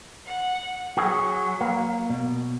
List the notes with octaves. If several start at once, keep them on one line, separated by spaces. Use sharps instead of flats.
F#5
F#3 F#4 G#4
A#3
B2